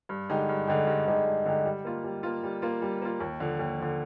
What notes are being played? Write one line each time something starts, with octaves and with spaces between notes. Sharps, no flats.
G2
D3 G#3 D#4 G4
G2
D3 G#3 D#4 G4
G2
D3 G#3 D#4 G4
G2
D3 G#3 D#4 G4
G3
A#3 F4
G3
A#3 F4
G3
A#3 F4
G3
A#3 F4
D#2
D3 F3
D#2
D3 F3